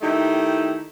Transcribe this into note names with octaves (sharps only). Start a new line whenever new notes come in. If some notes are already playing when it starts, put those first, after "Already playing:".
D#3 A3 D#4 E4 G4